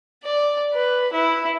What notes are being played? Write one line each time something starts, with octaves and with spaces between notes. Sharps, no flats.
D5
B4
E4